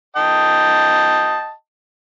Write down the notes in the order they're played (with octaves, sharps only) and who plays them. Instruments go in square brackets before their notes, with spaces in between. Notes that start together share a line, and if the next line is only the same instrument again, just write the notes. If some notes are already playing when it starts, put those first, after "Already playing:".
[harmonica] D#5 G5 A5